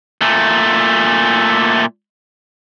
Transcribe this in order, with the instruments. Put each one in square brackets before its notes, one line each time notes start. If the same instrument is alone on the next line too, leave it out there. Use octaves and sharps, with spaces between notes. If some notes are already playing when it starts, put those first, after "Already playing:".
[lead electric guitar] A#2 A3